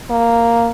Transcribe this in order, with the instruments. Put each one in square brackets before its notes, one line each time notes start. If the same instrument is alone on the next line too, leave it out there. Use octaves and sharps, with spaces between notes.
[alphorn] A#3